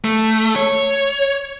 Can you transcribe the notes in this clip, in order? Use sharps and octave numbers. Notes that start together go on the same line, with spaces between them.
A3
C#5